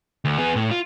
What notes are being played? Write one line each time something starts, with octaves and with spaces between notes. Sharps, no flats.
D2
B3 G#4
A2
F4